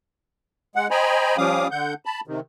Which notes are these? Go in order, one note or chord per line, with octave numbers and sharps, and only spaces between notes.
G#3 F#5
C5 D#5 G5 G#5 A#5 B5
F3 G3 C#4 F5 D6 D#6
D3 F#5 G6
A5 B5
C3 D#3